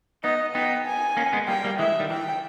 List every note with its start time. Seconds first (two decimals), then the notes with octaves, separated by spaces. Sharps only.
0.24 B3 D#4 D#5
0.55 B3 D#4 G5
0.87 G#5
1.17 A#3 C#4
1.33 G#3 B3
1.48 G3 A#3 G5
1.64 G3 A#3
1.79 E3 G#3 E5
2.00 D#3 G3
2.10 E3 G5